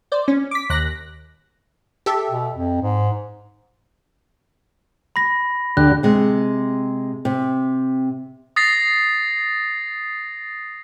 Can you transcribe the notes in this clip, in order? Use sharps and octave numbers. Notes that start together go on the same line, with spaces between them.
C5 D5
C#4
D6 B6
D#2 F#6 A#6
G4 A4 E5
B2
F2
G#2
B5 A#6
D2 D3 G4 F#6
C3 G#3
C3
D#6 A6 A#6 C7